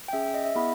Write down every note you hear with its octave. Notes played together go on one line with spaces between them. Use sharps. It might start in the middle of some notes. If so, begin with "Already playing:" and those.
G5
C#4 G#4 E5
D#5
E5
B3 E4 G#4 B5